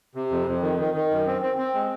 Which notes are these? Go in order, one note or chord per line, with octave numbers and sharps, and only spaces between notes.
C3
F2
F2
D#3
D#3
D#3
F#2
C4
C4
C4
G#3